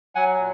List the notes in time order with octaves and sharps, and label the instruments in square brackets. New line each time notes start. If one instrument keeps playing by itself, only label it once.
[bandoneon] F#3 F#5 G#5
A#2